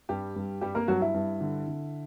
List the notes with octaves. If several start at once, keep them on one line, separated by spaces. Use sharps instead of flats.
G2 G3 G4
G2
G2 G3 G4
A#3 A#4
G2 F#3 F#4
E4
G2
D3
D3